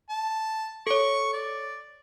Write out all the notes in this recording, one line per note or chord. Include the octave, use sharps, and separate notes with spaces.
A5
A4 C#5 C#6
D5